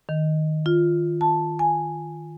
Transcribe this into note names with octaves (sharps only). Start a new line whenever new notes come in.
D#3
F4
A5
G#5